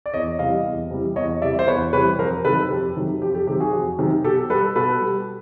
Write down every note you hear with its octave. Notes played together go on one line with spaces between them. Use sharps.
D5
E2 C#5 D#5
C3 E3 G3 D#5 F5
E2
C3 E3 G3
E2 C#5 D#5
C3 E3 G3 D5 E5
C5
E2 B4 C#5
C3 E3 G3 B4 C#5
F2 A#4 C5
C3 D#3 F#3 A4 B4
F2 G4 A4
C3 D#3 F#3
F2 G4
G4 A4
C3 D#3 F#3 G4
F#4 G#4
F2
C3 D#3 F#3
B2 G4 A4
G3 A4 B4
B2 A4 B4
G3